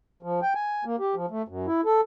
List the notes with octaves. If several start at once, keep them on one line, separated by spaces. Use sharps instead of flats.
F3
G5
G#5
A#3
G4
F3
A3
F#2
E4
A4